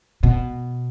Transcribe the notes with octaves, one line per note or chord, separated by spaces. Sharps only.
B2